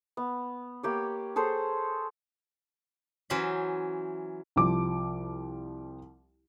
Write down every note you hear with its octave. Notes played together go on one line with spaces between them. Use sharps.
B3
A#3 G4 C#5
G#4 A4 C5 C#5
E3 F#3 C#4 C5 B5
C2 F3 D6